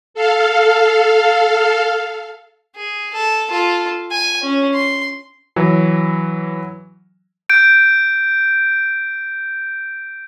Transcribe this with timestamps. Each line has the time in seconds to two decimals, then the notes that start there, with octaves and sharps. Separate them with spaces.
0.14 A4 F5
2.75 G#4
3.14 A4
3.50 F4 A4
4.11 G#5
4.43 C#4
4.74 C6
5.56 E3 F#3
7.50 G6 D7